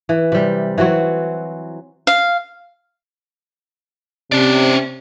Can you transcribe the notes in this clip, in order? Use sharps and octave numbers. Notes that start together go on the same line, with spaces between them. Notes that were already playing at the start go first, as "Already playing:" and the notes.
E3
C3 G3
E3 F#3 C4 F#4
F5
C3 C#4 D5